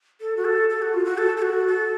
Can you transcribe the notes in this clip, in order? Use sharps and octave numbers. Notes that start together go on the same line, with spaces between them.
A4
F#4
A4
A4
F#4
F4
F#4
A4
A4
F#4
A4